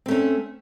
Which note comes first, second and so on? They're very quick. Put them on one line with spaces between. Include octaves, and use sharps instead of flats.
C4 A3 C#4